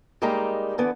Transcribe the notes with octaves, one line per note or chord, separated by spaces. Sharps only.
G3 G#3 A#3 D#4 G4 A#5
D3 E3 B3